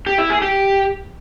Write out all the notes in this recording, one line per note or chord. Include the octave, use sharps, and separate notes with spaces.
G4
E4
G#4
G4